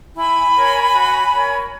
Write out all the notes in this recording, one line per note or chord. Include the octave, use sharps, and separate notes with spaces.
E4 G#5 B5
A#4 C#5
F#4
A#4 C#5